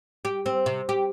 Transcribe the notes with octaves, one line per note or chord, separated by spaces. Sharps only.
G4
C4
C3
G4